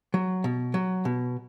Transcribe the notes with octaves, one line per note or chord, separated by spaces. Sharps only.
F#3
B2
F#3
B2